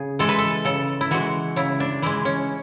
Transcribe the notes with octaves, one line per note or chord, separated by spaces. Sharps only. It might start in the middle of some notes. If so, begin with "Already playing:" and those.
Already playing: C#3 G#4
E3 G#3 A4
B4
A4
C#3 A4
E4
E3 G#3 F#4
C#3 E4
D4
E3 G#3 E4
C#4